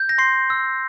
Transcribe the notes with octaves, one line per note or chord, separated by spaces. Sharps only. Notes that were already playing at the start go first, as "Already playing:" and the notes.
Already playing: G6
A#6
C6 C7
E6